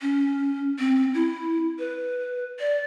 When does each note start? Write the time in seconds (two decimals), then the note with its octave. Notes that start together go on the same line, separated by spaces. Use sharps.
0.01 C#4
0.79 C4
1.14 E4
1.79 B4
2.60 D5